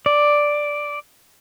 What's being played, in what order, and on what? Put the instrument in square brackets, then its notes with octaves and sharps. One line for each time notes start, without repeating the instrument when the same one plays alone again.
[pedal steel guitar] D5